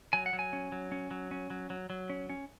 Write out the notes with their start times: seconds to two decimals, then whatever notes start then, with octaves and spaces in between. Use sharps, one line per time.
0.13 F#3 G#5
0.26 F#5
0.33 F#3
0.39 G#5
0.53 C#4
0.72 F#3
0.92 C#4
1.11 F#3
1.31 C#4
1.50 F#3
1.70 F#3
1.90 F#3
2.10 C#4
2.30 C#4